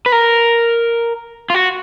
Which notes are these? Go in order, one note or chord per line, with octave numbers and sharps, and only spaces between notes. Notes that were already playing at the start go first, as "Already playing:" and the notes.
B4
A#4
F4
F#4